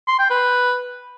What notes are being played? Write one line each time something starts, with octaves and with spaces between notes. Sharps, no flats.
C6
G5
B4